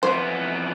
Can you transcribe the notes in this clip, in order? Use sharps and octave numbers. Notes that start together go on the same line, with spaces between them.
F2 E3 B3 C5